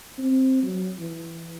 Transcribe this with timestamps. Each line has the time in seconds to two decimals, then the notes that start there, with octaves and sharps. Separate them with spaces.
0.18 C4
0.63 F#3
0.98 E3